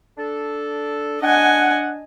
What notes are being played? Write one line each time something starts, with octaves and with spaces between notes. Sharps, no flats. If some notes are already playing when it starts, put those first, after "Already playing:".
D4 A4
D4 D#5 F#5 G#5